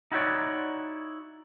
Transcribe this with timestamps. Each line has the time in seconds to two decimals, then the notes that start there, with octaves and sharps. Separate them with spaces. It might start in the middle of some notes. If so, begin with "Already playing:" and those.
0.12 D#4 E4 F#4 G4 C#5 D5